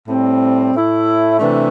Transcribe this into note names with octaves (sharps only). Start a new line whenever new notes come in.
A2 G3 C4
A2 A3 E4
C3 E3 A3 D4